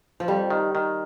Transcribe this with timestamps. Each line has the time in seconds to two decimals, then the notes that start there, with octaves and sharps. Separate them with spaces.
0.20 F3
0.28 F2 G3
0.50 D#3
0.75 D#3